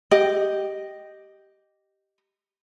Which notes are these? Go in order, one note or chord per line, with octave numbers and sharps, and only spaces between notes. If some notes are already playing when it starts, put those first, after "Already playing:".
G4 D#5